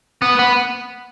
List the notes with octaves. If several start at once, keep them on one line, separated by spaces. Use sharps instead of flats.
B3
B3